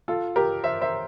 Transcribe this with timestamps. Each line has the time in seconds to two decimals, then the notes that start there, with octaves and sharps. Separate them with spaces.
0.08 F4 A4
0.36 G4 A#4
0.64 C5 E5
0.81 C5 E5